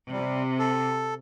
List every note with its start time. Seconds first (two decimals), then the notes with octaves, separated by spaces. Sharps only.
0.12 C3 G3
0.59 A4